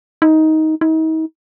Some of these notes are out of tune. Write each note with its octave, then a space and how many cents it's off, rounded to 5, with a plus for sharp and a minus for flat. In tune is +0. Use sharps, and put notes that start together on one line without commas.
D#4 +15
D#4 +40